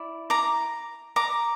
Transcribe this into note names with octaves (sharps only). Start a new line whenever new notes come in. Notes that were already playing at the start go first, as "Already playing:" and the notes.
Already playing: E4 D5
A#5 D6
A#5 D6